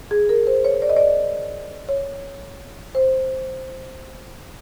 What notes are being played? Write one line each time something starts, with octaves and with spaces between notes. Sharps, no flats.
G#4
A#4
C5
C#5
D5
D#5
D5
C#5
C5